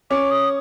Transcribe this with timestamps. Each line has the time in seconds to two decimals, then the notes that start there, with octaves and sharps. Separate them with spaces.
0.10 C#4 D6
0.31 D#6